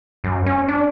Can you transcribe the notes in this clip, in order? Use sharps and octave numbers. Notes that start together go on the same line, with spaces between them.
F#2
C#4
D4